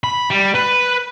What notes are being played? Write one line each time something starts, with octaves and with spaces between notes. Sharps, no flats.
B5
G3
B4